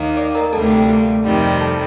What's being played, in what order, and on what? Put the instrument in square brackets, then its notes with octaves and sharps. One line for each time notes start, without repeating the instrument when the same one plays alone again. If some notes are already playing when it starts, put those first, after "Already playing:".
Already playing: [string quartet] D#2 D#3 A#3 [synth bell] D6
[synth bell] D5 D6
A#4 A#5
[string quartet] D2 C3 G3 A#3 [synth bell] A4 A5
[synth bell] G4 G5
[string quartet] F2 C3 D#3 G3
[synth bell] A4 A5